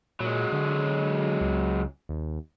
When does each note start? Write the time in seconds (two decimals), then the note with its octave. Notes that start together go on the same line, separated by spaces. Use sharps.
0.20 A#2 F#3 G#3
0.52 D3
1.41 C#2
2.09 D#2